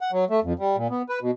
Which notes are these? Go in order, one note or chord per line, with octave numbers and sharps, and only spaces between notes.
F#5
F#3
A3
F2
G3
A#2
B3
B4
B2